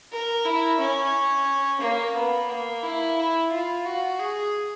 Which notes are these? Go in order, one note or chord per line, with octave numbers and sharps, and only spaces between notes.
A#4
E4
C#4
A#3
B3
A#3
E4
E4
F4
F#4
G#4